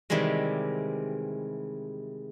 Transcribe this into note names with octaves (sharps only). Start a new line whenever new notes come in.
C3 D#3 E3 G3 G#3